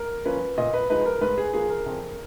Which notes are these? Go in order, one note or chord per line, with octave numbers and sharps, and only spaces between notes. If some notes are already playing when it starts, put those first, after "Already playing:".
Already playing: A#4
F3 A#3 C#4 B4
A#2 D#5
B4
F3 G#3 D#4 B4
A#4
G#2 B4
G#4
F3 A#3 G#4
A#4
F2